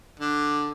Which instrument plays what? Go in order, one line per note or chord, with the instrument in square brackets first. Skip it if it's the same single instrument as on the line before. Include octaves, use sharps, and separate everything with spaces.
[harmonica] D3 D4